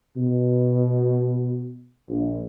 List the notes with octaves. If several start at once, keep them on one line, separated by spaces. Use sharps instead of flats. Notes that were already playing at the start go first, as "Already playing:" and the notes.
B2
A#1